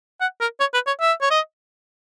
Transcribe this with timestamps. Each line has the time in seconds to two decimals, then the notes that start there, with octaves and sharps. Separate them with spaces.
0.21 F#5
0.41 A#4
0.60 C#5
0.74 B4
0.87 C#5
1.00 E5
1.21 C#5
1.31 D#5